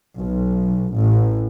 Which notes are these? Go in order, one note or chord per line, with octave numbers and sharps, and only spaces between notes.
B1
A1